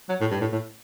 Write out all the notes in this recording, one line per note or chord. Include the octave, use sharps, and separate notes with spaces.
F#3
A2
G2
A2
A2